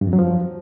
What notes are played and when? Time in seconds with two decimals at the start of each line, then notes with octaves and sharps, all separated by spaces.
0.01 G2
0.07 F2
0.13 F#3
0.19 F3